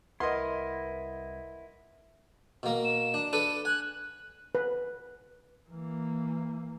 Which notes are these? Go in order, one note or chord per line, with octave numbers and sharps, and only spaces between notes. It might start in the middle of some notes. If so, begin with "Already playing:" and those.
C2 E4 A#4 B4 D#5 F#5 C6
B2 A#3
E7
D4
D4 A4 B4 D#7
G#5 F#6
B4
E3 A#3